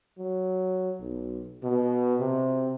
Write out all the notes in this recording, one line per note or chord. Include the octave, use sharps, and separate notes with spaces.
F#3
B1
B2
C3